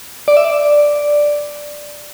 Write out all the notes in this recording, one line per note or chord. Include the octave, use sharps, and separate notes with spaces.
D5
E5
D5